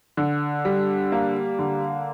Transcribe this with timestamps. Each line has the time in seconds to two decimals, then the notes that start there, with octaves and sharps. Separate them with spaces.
0.17 D3
0.65 G3
1.12 A#3
1.59 D3